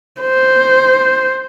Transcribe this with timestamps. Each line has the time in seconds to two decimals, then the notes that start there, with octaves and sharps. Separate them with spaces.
0.21 C5